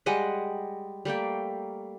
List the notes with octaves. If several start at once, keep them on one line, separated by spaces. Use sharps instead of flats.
G3 G#3 D#5 F#5
G3 A3 A#3 G5